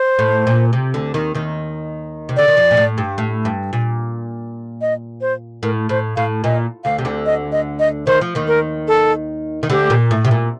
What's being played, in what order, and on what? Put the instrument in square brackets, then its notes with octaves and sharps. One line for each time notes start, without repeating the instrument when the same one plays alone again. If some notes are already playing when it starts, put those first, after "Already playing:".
Already playing: [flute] C5
[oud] A2
A#2
C3
D2 D3
D#2 D#3
D#2 D#3
C3
[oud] D3 [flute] D5
[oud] D#3
F2 F3
A#2
A2
G2
A2
G2
A#2
[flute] D#5
C5
[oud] A2 [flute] A#4
[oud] A2 [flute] C5
[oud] A2 [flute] F5
[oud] A#2 [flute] D#5
[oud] D2 D3 [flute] F5
[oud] C3
D2 D3
[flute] D#5
D#5
D#5
[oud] D#3 [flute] C5
[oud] F3
D#2 D#3
[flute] A#4
A4
[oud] D#3
[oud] D2 D3 [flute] G4
[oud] A#2
A2
C3
A#2